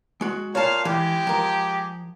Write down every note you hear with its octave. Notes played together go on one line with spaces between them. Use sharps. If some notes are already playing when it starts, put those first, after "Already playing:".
G#3 F#4
A#2 C#5 F5 A5
E3 G#3 G4
F3 A#4